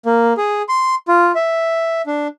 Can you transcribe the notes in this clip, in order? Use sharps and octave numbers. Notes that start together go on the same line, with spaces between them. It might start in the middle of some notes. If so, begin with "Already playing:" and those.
A#3
G#4
C6
F4
E5
D4